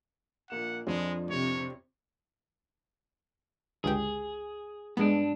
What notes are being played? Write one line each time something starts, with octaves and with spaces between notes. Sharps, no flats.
A#1 A#3 F#5 E7
F2 F3 G#3 D4
C3 C#5
G1 C#2 G4 G#4
G2 G#3 B3 D4